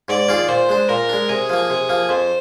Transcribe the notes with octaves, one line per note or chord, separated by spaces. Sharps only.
G#2 D5
D#3 A#3 F4 G#4
A#2 C5
G#3 D4
A#2 A#4
G#3 D4
C3 G#4
F3 A#3
C3
F3 A#3
F2 C5